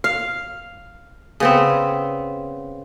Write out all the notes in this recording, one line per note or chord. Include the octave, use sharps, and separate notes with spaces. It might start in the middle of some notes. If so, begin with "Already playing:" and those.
F5
C#3 B3 C4